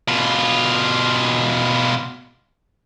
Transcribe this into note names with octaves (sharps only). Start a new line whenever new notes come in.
B2 F4